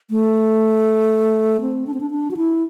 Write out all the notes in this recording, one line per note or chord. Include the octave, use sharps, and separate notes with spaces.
A3
C4
D4
C4
D4
D4
F#4
E4